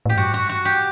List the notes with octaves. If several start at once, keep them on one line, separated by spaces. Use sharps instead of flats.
A2 G4
G2 F#4
F#4
F#4
G4